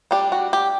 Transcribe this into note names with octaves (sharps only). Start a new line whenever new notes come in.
G3 D4 G4
F#4
G4